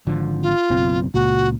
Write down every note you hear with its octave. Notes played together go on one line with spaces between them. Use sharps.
G#1 D3 F3
F4
F#1 B1 C4
C#2 A#2 F#4